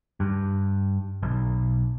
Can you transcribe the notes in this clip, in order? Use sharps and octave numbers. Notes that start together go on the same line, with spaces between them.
G2
B1